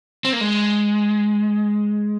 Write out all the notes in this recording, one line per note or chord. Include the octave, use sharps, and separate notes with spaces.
C4
A#3
G#3